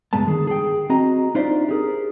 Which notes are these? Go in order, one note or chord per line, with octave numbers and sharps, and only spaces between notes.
C#2 G2 G3 G#3 B3 A5
D3 D#3 G#4
G#4 G5
C4 F#4 D#5 A#5
D4 D#4 F4 C5 D5 E5
G4 G#4 A#4